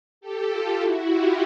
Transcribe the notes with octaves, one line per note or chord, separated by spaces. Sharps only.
G4 A4
F4 G4
E4 F#4
F4 G4